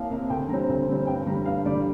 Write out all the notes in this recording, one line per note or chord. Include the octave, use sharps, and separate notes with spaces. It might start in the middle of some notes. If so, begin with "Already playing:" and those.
Already playing: C2 C3 A#3 F5
C3 A#3
D2 G5
D3 G3 C4 A#5
D2
D3 G3 C4
G2 G5
D3 G3 A#5
G2 F5
D3 G3 D5